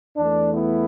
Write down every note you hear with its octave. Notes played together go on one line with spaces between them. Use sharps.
E2 E3 A3 D4
B3 E4